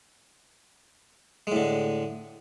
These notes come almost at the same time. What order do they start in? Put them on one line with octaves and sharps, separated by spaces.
G#3 A2 D3